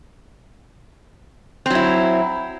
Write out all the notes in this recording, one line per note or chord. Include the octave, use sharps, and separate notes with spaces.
F#3 C4 E4